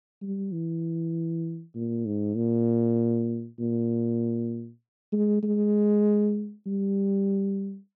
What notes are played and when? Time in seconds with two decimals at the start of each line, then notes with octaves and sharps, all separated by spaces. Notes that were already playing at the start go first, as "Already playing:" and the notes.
0.22 G3
0.52 E3
1.75 A#2
2.06 G#2
2.36 A#2
3.59 A#2
5.13 G#3
5.43 G#3
6.67 G3